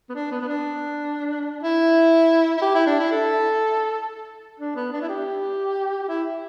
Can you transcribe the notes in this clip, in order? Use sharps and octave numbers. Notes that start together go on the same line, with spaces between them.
B3
D4
B3
B3
D4
E4
E4
G4
E4
D4
E4
A4
D4
B3
D4
E4
G4
G4
E4